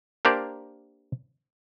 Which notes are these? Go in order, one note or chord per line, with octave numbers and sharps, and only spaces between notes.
A#3 D4 G4 A#4 C5 D5